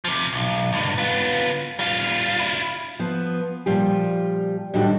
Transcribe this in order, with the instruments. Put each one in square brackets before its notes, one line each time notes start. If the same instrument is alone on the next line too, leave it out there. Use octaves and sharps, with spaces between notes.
[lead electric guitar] C3 F3
B1
C#2 G2
B3 F4
G3 F4
E4 F4
[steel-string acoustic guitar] F3 B3
A#2 F3 G3 F4 G4
A2 D#3 G3 D4 F#4 G4